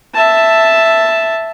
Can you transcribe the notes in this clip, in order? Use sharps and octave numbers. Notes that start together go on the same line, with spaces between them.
E5 A5